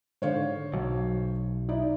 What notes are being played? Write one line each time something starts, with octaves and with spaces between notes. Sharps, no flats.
G#2 D3 C5 C#5 F5
B1 F#3
D#4 E4 D5